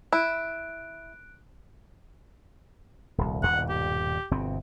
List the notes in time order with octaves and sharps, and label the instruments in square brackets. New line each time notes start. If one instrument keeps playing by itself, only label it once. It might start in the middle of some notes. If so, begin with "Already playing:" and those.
[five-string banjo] E4 [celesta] F#6 D7
[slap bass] D#1 C2
[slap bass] D#1 G2 B2 [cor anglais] F#5
[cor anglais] G4
[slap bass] G1 B2 C4